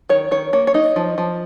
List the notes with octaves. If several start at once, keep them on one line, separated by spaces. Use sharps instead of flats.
D#3 C#5
D#3 C#5
A#3 C#5
C#5
D#4 D#5
F3
F3